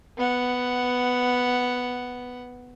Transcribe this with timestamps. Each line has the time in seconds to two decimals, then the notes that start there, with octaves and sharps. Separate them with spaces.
0.18 B3 F#5